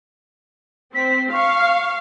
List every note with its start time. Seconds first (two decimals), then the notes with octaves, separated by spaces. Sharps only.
0.95 C4 B6
1.33 F5 C#6